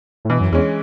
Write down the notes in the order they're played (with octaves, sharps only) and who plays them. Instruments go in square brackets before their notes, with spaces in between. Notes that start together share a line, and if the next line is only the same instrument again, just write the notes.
[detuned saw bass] A2
[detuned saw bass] B2 [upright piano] E3
[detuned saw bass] F#2
[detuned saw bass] E2 [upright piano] G#3 C#4